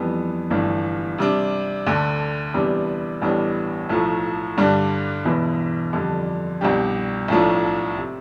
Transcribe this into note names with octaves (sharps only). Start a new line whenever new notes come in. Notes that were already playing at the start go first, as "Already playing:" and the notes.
Already playing: F2 E3 G3 B3
G1 G2 E3 A3 D4
C3 G3 D4
D2 D3 A3
E2 C3 G3 B3 D4
A1 A2 G3 B3 D4
B1 A2 F3 A3
G2 D3 G3 D4
E1 E2 B2 B3 E4
F2 D3 G3 D4
C2 B2 G3 D4 G4
B1 A2 F3 A3 D4
C3